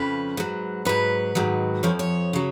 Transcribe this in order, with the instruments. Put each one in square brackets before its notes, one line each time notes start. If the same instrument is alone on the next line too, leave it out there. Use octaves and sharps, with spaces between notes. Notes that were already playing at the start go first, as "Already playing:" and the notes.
Already playing: [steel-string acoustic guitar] F2 C#3 F3 B4
G#2 F#3
G#2 F#3 B4
G#2 D#3 F#3
F2 F3 C#5
C#5
C#3 F#3